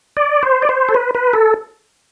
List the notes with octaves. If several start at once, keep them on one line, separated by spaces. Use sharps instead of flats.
D5
C5
D5
C5
A4
B4
B4
A4